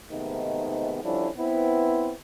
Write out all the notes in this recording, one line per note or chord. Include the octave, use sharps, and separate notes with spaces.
G#2 C3 D#3 A3 B3 D#4
D3 F3 G3 C#4 D4 E4
B3 C4 E4